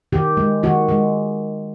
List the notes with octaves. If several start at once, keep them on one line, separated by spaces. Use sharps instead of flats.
D#3 G4
G#3
D#3 F#4
G#3